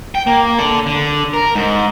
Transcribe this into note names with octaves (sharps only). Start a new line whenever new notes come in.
G5
A#3
A4 D5
D3
A#4
G#2